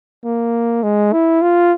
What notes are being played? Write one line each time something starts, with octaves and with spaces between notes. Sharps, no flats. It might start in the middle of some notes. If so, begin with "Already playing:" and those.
A#3
G#3
E4
F4